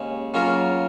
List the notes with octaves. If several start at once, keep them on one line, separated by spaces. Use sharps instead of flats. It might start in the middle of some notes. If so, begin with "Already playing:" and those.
Already playing: D#2 C#3 G#3
C#3 F#3 A#3 F4 A#4